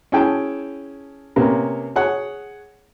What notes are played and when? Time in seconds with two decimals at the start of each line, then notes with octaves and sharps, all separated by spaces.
0.12 C#4 E4 G#4 G5 A5
1.36 C3 A#3 B3 C#4
1.96 G#4 C#5 F#5